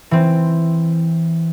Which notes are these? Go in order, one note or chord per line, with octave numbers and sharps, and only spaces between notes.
E3 C4